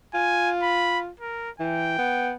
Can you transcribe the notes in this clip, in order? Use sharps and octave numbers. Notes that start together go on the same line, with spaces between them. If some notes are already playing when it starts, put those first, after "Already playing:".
F4 G#5
B5
A#4
E3 G5
B3